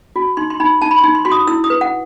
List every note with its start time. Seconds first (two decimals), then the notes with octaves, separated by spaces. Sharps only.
0.16 F#4
0.37 D#4 C6
0.50 C6
0.60 D#4 B5
0.81 D#4 A5
0.91 B5
0.98 C6
1.04 D#4
1.15 C6
1.25 F#4 C6
1.32 D#6
1.47 E4 E6
1.64 D#6
1.70 B4
1.81 F#5